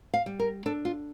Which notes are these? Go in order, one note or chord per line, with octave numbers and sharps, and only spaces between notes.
F5
G3
A#4
D4 A4
F4